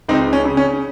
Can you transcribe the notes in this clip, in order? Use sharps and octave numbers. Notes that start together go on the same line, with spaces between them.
C#2 C4 D#4
C#4
C#3
C#4